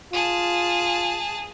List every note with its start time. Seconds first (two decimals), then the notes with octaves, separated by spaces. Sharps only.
0.13 F4 G#4 A5